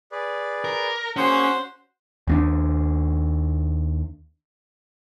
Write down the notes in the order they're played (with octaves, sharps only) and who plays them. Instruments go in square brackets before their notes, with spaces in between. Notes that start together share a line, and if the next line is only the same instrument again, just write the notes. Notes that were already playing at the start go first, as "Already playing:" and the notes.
[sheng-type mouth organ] G#4 B4 D5
[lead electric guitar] A#4
[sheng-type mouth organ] A#3 G#4 [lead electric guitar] C#4 [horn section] F#4 C5 F#5
[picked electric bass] D#2 A#3 D4